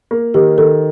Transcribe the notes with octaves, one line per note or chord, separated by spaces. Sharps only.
A#3
D#3 G4
D#3 A4